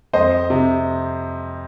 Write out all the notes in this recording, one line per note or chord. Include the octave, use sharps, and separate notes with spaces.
F2 C5 D#5
C3